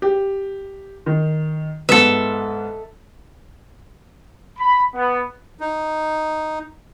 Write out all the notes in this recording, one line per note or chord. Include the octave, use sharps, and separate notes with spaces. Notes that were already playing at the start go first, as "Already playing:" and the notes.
G4
D#3
G#2 B3 A4 E5
B5
B3
D#4